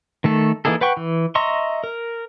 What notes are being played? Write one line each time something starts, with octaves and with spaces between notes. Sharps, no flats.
D#3 A3 A4
E3 A#3 D#4 G#4 A4
B4 F#5 G5 C#6
E3
D#5 E5 A#5 C6 C#6
A#4